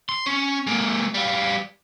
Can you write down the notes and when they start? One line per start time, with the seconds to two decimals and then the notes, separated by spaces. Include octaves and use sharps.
0.09 C6
0.26 C#4
0.67 G#3 A#3
1.14 G3 F5